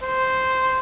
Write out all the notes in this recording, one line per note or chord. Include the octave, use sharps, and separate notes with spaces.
C5